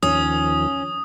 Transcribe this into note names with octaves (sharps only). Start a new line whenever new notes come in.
D#2 D#3 F3 C#4 D#6